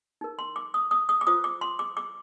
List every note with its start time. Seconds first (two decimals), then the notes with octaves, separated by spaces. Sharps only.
0.21 D#4 A#4
0.39 C6
0.56 D6
0.74 D#6
0.91 D#6
1.09 D#6
1.21 D6
1.27 F4 C5 D#6
1.44 D6
1.61 C6
1.79 D6
1.97 D6